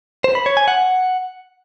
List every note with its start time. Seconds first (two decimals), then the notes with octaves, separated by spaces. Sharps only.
0.24 C5
0.35 B5
0.46 C#5
0.57 G#5
0.68 F#5